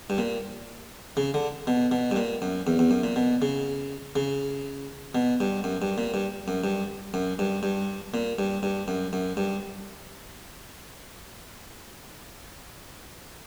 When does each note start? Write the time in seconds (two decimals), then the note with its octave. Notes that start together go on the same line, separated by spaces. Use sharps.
0.10 G2
0.18 A#2
1.17 C#3
1.34 D3
1.67 B2
1.92 B2
2.11 G2
2.16 A#2
2.42 F#2
2.67 E2
2.79 E2
2.91 F#2
3.03 A#2
3.16 B2
3.42 C#3
4.16 C#3
5.15 B2
5.40 G2
5.64 F#2
5.82 G2
5.98 A#2
6.14 G2
6.48 F#2
6.64 G2
7.14 F#2
7.39 G2
7.63 G2
8.14 A#2
8.39 G2
8.63 G2
8.88 F#2
9.13 F#2
9.37 G2